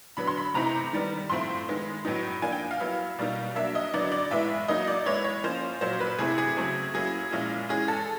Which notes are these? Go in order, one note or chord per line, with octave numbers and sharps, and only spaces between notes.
D3 F#3 B3 B5
C6
B5
C3 E3 A3 C4 D#4 A#5
D#3 G3 B3
A2 F3 A3 C4 E4 C6
D#3 G#3 B3
A2 F#3 B3 D#4
F3 A#3 D4 G#5
G5
F5
F#3 B3 E4
B2 G3 A#3 D#4
F#3 A#3 D4 E5
D#5
D3 F#3 B3 D#4 D5
D5
A2 E3 G#3 B3 E5
F#3 A#3 D#4 D#5
D5
E3 G#3 B3 E4 C#5
C#5
F3 A#3 C#4 C5
A#2 F#3 A#3 C5
B4
C3 E3 A3 C4 E4 G#4
G#4
C#3 F#3 A3 C4
F#3 A#3 C#4 E4 G#4
A#2 F3 G#3 C#4 E4
E3 G#3 C#4 G#4
A4